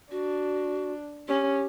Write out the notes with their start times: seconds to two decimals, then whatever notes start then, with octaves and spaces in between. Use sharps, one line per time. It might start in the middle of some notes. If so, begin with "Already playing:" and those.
0.11 D4 F#4
1.28 C#4 G4